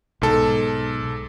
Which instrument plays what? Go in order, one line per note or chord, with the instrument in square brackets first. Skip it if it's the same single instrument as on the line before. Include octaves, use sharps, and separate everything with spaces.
[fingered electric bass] B1 [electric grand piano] G#2 A4